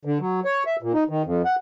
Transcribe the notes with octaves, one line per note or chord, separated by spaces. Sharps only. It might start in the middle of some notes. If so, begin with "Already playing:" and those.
D3
F#3
C#5
E5
A#2
D#4
D#3
F2
F#5